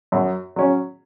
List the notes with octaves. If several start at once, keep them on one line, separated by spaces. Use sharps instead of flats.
F#2
F#3 C#4